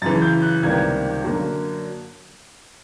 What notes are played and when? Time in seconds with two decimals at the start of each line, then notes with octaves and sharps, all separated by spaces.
0.02 F#2 C#3 E3 A6
0.22 G6
0.42 F#6
0.62 C#2 C3 D#3 G3 A#3 G#6
1.24 F#2 D3 F#3 A#3